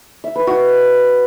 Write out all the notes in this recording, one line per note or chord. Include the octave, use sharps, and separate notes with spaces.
E5
B4
F#4